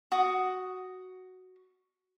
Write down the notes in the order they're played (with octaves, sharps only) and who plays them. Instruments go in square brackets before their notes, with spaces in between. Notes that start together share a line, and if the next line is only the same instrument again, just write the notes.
[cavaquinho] F#4 D#6